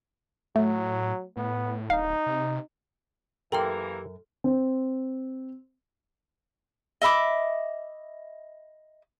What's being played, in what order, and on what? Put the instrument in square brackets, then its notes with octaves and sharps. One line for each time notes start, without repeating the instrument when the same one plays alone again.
[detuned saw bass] A2 [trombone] F#3 [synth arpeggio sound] A3
[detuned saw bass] A2 [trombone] B3
[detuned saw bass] D1 [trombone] D#4 [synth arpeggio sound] F5
[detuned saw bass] C3
[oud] F#2 A#4 [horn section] E3 A#3 [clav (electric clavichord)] G4 [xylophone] A4 C6 F6
[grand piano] C4
[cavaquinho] D#5 E5 B5 D6